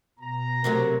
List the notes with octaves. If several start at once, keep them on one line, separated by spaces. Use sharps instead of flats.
B2 A#5
C3 F#3 A3 A#4